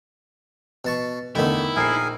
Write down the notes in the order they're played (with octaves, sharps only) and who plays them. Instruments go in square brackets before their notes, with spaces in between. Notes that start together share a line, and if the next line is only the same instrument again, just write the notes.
[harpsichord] B2 A5 C#6
[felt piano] E2 D3 A3 [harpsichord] D#3 D#4 [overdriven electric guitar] E4
[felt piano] A#1 C7 [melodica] G#4 A#4 G#5